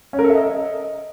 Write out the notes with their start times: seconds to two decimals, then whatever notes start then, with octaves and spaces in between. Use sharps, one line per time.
0.13 C#4
0.19 A#4
0.24 A4
0.30 E5
0.35 D#5